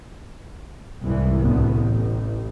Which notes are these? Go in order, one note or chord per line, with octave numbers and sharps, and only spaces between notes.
C2 G#2 E3
D2 A2 B3
A1